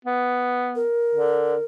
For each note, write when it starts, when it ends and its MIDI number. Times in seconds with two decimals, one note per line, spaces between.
0.05 0.85 59
0.76 1.65 70
1.15 1.55 50